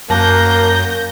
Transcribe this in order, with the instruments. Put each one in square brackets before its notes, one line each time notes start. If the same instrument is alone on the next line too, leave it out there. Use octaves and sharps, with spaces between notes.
[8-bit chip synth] F#2 A#6 [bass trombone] A#3 [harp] A5 F#6 [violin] G6